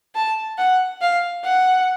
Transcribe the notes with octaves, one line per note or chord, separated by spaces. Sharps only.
A5
F#5
F5
F#5